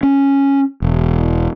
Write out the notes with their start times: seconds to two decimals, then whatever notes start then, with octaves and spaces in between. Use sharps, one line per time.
0.03 C#4
0.82 E1